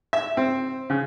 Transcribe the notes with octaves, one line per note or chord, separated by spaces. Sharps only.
E5
C4
C#3